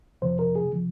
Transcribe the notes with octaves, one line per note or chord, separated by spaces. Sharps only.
F2 C3 F3 C5
A#4
G#4
C3 F3